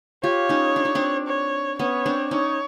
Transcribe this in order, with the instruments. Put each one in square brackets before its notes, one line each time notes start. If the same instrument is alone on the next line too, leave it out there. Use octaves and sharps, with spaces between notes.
[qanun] F4 G4 [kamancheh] C#5
[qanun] C#4 D#4
D4
D#4
C4 D4
[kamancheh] C#5
[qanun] B3 C#4 [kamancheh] C#5
[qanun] C4 D4
[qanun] C#4 D#4 [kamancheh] C#5